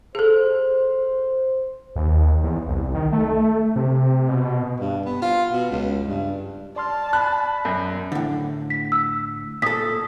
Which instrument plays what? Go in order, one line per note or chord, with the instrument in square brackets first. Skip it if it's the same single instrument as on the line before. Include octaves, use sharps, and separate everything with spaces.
[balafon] G#4 A4 [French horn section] C5
[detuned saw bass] D#2
E2
C2
D#3
A3
C3
B2
[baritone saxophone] G2
B3
F4
B2
C#2
G2
[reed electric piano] D5 C6 F6 [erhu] A5
[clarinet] B5 [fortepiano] F#6
[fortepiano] F#2
[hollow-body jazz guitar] A2 D3
[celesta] B6
E6
[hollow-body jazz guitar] A#2 A4 [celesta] D#6 B6